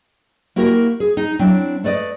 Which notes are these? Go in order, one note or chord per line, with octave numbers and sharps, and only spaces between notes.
A#3 E4 F#4 G4 A#4
G#4
D#4
F#3 C4 D4 E4
A3 B4 D5 D#5